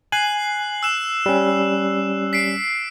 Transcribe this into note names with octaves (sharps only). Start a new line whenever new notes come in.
G#5 F#6 C7 F#7
E6 F#6 E7
G3 C#4
B6 C7 D7